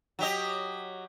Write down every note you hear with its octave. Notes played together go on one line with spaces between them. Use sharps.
F#3 G4 D#5